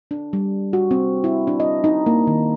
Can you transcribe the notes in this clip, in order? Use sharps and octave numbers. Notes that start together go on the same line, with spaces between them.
D4
G3
F#4
C4
E4
D4
D#5
D#4
A#3
D#3